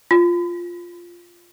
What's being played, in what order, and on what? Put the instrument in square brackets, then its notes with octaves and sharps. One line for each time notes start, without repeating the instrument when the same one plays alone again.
[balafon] F4